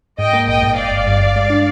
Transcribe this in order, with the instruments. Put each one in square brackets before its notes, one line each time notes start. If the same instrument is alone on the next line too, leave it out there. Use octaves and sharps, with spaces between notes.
[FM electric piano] G#2 [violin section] D#5 G5
[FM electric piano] A#3
[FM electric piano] A#1 [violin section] D#5 G5
[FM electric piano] G#2
[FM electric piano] G1 [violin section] D5 F5
[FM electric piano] G1
G2
G2
G#3
D4